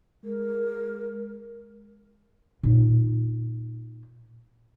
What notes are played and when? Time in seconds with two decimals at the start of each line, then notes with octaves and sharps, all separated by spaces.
0.24 G#3 A#4
2.63 A#2 D#4